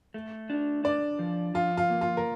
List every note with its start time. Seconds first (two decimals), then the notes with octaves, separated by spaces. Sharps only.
0.14 A3
0.50 D4
0.84 D4 D5
1.19 F3
1.54 F3 F4
1.77 F4
1.90 A#3
2.01 F4
2.17 A#4